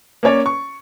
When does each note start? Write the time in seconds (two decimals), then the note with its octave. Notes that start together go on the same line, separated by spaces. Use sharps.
0.23 A#3 C#4 C#5 D5
0.46 C#6